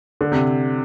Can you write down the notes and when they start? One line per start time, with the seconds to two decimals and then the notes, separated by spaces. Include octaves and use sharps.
0.21 D3
0.32 C3